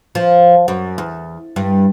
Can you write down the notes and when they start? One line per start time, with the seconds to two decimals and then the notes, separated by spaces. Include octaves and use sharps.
0.15 F3
0.68 F#2
0.98 E2
1.56 G2